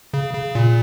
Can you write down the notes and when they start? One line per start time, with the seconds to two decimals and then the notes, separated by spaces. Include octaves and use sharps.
0.14 C#3
0.34 C#3
0.55 A#2